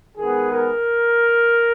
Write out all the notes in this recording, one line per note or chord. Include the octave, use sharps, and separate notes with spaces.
D#3 G#3 B3 G#4
A#4